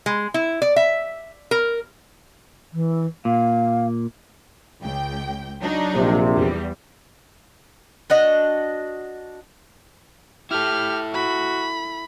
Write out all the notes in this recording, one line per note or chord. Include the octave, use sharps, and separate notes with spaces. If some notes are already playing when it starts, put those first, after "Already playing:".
G#3
E4
D5
E5
A#4
E3
A#2 F5
C#2 G5
F#3 D4 D#4
A#1 C3
E2 G3
D4 F#4 D#5
E4 G4 A4 F6
F#4 B5